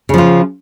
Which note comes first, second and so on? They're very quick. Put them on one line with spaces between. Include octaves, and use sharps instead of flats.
C#3 F3 F4